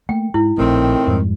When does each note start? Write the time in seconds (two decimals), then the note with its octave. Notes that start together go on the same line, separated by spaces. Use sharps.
0.09 A3 A#3 G5
0.34 G#2 E4
0.58 A#1 A2 D#3 A3 C4
1.07 F2 G#2 G3